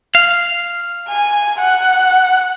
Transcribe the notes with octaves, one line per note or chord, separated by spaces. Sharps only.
F5
G#5
F#5